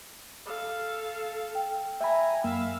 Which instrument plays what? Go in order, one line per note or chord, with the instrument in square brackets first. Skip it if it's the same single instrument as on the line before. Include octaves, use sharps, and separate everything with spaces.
[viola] A4 F5
[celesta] G5
[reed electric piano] E5 B5 [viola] G#5 A#5
[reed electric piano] F#2 A#3 [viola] E5 F5